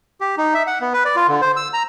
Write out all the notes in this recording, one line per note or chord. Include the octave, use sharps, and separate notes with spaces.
G4
D#4
E5
F#5
B3
B4
D5
F4
D3
C5
E6
A#5